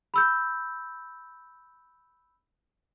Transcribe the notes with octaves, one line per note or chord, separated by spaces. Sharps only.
B5 E6 G6